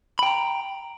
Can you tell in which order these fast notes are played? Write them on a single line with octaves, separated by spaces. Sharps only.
B5 G5 A#5